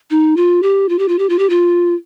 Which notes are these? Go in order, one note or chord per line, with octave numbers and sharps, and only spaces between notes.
D#4
F4
G4
F4
G4
F4
G4
F4
G4
F4